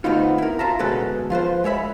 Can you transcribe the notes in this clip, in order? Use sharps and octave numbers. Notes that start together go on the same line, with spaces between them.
D3 A3 B3 C4 D#4 F4
E4 A#4
F4 E5 A5 A#5
D2 B2 G#3 C#4 A4 B4
F3 F4 B4 C5
G#3 C#5 E5 B5